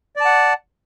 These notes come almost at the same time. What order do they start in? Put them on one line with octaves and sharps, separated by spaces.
D5 A5 F#5